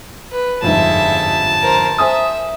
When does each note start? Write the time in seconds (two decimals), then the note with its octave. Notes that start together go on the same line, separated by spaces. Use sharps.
0.32 B4
0.62 G1 F2 G#2 G#3 E5 A5
1.62 A#4 C5
1.98 C5 E5 G#5 D#6